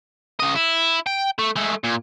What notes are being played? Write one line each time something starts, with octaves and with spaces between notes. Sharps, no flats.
C#3 D#5
E4
G5
A3
G#3 A3
A#2